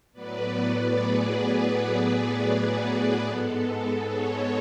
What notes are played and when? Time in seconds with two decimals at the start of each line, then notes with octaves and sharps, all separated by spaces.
0.13 A2 F#3 B3 B4 D5
0.91 G#4 B4
3.26 G#2 G#3 B3 A4
4.05 A4 C#5